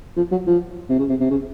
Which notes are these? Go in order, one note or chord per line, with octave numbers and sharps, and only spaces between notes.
F3
F#3
F3
C3
C#3
C3
C3
C#3